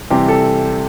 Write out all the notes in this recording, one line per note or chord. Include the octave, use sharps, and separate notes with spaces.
C3 E3 G3 C4 G4
A4